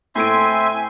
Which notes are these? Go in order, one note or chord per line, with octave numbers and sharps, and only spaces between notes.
A2 C4 A4 E5 G#5 C6 D7